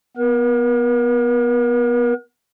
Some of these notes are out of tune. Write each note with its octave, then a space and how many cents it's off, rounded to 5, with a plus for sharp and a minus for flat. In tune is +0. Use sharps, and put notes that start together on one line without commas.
B3 +0 A#4 +45